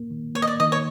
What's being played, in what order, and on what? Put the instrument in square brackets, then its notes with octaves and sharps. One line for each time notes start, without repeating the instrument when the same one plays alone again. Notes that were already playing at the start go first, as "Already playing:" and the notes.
Already playing: [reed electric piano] A#3
D#3
[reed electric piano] A#3 [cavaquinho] C#5
[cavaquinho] D#5
D5
[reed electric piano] D#3 [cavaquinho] D#5
[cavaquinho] C#5